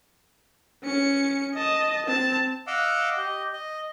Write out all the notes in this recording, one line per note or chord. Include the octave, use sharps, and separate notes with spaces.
C#4 C#7
D#5 A5
C4 A5
D#5 F5 F#5 D6 E6
G4 D#5
D#5